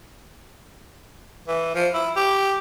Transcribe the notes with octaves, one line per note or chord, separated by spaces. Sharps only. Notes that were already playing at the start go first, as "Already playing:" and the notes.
E3
F3
E4
G4